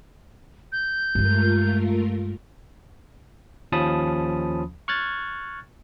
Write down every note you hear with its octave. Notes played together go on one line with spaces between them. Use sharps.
G6
G2 G#3 A3 F4 A#4
D#2 F3 C#4 A5 B5 D#6
C#6 F6 F#6 G#6 A6